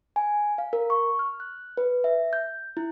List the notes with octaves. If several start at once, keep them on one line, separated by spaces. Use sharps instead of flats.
G#5
F5
A#4
C#6
F6
F#6
B4
E5
G6
E4